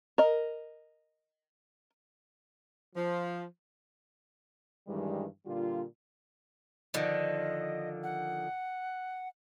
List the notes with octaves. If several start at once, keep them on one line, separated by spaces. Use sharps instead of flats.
A#4 D#5
F3
G2 D#3 E3 G3 G#3
A#2 D3 G3 F4
D3 D#3 F3 D#5
F#5